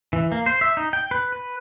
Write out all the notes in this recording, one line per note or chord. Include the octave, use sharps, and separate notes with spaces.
E3
A#3
C5
E5
D#4
G5
B4
B4